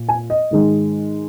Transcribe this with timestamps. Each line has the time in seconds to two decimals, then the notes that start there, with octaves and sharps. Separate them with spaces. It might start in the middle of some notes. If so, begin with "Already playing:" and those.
Already playing: A#2
0.09 G#5
0.30 D#5
0.51 G#2 D#3 G#3